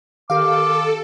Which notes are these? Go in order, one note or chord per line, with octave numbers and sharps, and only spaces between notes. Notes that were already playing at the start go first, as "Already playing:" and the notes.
D#3 G4 A4 A#4 F5 D6